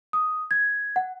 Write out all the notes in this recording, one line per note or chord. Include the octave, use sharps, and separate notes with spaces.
D#6
G#6
F#5